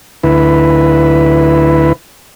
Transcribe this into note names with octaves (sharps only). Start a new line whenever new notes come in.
D2 E4 B4